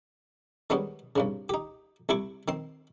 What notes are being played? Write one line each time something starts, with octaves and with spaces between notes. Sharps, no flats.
D#3 G3 G#3 B3 C#4
C2 G2 C#3
D#4 G4
C2 C3 E4 C#6 D6
D#3 C4 C6